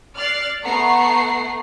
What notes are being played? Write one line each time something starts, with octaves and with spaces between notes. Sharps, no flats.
D5 F6 F#6 A6 C7
A3 B3 F#5 A#5 C#6 C7